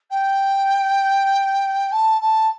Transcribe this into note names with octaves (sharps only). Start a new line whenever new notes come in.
G5
A5
A5